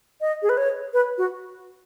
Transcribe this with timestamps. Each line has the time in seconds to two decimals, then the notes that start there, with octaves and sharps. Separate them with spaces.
0.21 D#5
0.42 G#4
0.49 B4
0.57 C#5
0.93 B4
1.18 F#4